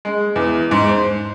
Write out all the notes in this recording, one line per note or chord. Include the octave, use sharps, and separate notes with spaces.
G#3
E2
G#2
C5